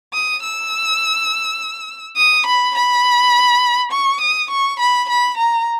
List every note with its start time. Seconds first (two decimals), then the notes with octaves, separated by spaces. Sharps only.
0.13 D#6
0.43 E6
2.17 D#6
2.47 B5
2.76 B5
3.92 C#6
4.21 D#6
4.51 C#6
4.80 B5
5.09 B5
5.38 A#5